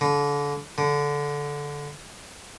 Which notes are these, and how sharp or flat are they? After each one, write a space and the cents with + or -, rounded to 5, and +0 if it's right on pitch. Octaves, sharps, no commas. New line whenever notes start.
D3 -30
D3 -15